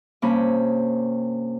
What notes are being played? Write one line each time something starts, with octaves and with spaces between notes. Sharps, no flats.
G2 C3 G3 A#3 C#4 B5